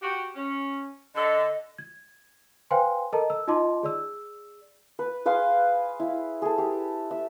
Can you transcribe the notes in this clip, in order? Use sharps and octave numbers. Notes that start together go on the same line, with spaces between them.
F#4 G4
C#4
D3 A4 D#5
G#6
B4 C5 F5 G5 G#5 C6
A4 A#4 D#5 A5 A#5
E6
D#4 F4 D#5 A5 C6 D6
G#4 D5 E6
B4
G#4 B4 F5 C6
E4
G#4 A4
G4
E5